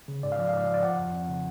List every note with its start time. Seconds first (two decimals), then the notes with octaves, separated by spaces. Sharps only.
0.08 C#3
0.23 G#2 D5
0.32 F5
0.39 F3 D5
0.49 F5
0.53 G#2 D5
0.66 F3 F5
0.74 D5
0.83 F3 F#5
0.98 F2
1.13 F2
1.29 C#3